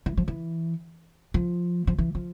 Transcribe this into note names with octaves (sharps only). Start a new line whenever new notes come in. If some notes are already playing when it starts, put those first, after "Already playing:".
E3
F3
E3
F3
F3
E3
F3